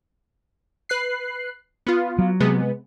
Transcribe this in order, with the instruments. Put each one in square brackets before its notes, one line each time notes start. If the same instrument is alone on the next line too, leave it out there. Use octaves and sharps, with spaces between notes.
[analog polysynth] B4 F#6 C7
B3 F4
[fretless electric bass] F#3
[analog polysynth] C3 G#3 B3